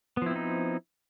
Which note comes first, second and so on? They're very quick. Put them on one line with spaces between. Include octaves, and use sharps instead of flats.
B3 F3 E4 C4 D#4